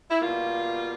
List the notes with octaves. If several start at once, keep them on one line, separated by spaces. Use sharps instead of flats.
E4
B2 G3 A#3 F4